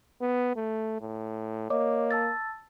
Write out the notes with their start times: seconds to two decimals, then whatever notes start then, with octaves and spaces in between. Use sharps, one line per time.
0.21 B3
0.56 A3
1.01 A2
1.70 A#3 C#5 D#5 D6
2.11 A5 E6 A6